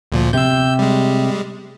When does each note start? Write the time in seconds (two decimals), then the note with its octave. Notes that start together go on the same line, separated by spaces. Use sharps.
0.12 D2 A#2 F3
0.33 C3 E6 G6
0.79 G3 G#3